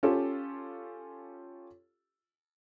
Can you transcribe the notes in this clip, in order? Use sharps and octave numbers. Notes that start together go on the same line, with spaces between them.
C#4 F4 G4 A4